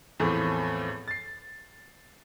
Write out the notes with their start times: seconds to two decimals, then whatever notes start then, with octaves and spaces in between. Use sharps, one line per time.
0.20 E2 A2 E3 F3 A3 C4
1.08 A6 C7